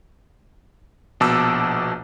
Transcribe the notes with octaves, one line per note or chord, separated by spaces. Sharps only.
A#1 B2 A5 D6 E6